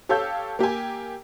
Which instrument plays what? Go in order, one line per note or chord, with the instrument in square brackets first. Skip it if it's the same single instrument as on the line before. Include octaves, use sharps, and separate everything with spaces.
[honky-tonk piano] G4 A4 C#5 F5 E6 G6
A#3 G4 G5 G#5